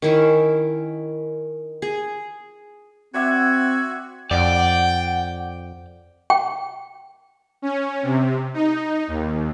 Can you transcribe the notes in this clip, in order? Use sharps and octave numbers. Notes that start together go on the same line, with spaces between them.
D#3 C#4 E4
G#4
C4 F#4 D5 E5 F#5 G#6
F2 D5 F#5 G5
G5
C#4
C3
D#4
D#2